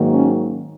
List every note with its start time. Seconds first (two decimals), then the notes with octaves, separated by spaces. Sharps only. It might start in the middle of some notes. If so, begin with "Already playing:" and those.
Already playing: G#2 D#3 F#3 A#3
0.12 C#4